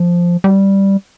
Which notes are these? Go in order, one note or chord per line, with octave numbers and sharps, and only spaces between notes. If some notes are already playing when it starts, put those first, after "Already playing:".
Already playing: F3
G3